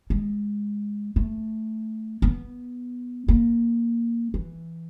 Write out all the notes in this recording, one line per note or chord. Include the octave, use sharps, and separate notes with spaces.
G#3
A3
B3
A#3
E3